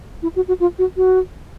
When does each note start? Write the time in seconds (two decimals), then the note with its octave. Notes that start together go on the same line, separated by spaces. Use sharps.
0.22 E4
0.36 F#4
0.48 F#4
0.60 F4
0.79 F#4
0.97 F#4